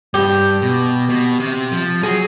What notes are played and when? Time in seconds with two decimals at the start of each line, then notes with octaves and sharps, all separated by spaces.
0.14 G2 G4
0.62 B2
1.09 B2
1.40 C3
1.72 F3
2.03 F#3 G#4